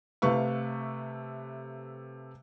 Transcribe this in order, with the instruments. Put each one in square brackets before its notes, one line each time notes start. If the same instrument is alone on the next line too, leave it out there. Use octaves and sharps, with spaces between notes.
[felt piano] C3 A3 B4 F5 C#6